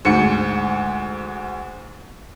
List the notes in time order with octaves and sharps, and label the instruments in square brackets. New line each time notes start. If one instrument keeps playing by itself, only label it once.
[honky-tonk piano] D2 G#2 C#7